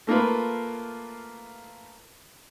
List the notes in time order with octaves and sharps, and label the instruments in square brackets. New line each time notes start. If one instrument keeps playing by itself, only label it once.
[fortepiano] A3 A#3 F4 B4